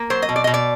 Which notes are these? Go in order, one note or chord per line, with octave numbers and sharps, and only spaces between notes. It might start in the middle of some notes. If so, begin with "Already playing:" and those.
Already playing: A#3
F#3 C5
D#5
B2
D5
B2 D#5
D5